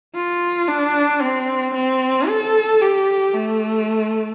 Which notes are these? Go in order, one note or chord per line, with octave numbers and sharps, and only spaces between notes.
F4
D4
C4
C4
A4
G4
A3